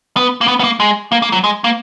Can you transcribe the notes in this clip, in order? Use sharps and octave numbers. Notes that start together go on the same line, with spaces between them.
B3
A#3
B3
B3
A#3
G#3
A#3
A#3
F#3
G#3
A#3